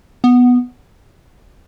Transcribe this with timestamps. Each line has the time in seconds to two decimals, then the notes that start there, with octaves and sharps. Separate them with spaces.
0.24 B3